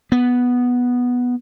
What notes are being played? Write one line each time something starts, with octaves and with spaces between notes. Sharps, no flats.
B3